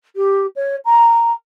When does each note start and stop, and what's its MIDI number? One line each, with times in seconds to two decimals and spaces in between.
0.16 0.47 67
0.56 0.76 73
0.85 1.31 82